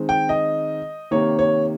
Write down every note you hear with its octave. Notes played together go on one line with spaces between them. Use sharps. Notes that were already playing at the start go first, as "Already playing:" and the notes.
Already playing: D#3 G#3 C4
G5
D#5
C3 D#3 A#3 C#5
C#5